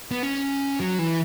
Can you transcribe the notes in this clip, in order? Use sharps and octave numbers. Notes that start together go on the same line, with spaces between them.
B3
C#4
F#3
E3